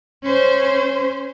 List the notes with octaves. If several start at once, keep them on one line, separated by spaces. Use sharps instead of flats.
C#4 C5